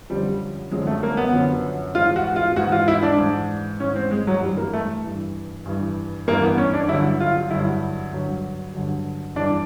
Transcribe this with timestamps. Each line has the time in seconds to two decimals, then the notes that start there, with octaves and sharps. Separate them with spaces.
0.10 F#2 D3 F3 G3
0.71 F#2 D3 F3 G#3
0.87 A3
1.03 A#3
1.17 B3
1.33 F#2 D3 F3
1.95 G#2 E3 F4
2.16 F#4
2.36 F4
2.56 G#2 E3 F#4
2.72 F4
2.88 E4
3.03 D4
3.18 G#2 E3
3.80 G#2 E3 C#4
3.96 C4
4.11 G#3
4.27 F#3
4.42 G2 E3 G3
4.57 A#3
4.73 A3
5.04 G2 E3
5.66 G2 E3
6.28 G2 E3 A#3
6.43 B3
6.58 C#4
6.74 D4
6.88 G2 D3 F#3 E4
7.20 F4
7.51 G2 D3 F#3 E4
8.13 G2 D3 F#3
8.74 G2 D3 F#3
9.36 G2 E3 D4